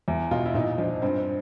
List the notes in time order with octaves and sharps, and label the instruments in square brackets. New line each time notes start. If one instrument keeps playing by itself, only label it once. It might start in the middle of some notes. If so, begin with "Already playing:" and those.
[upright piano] E2
B2 F4
E4
A#2 D#4
F3 D4
G2 C4
C4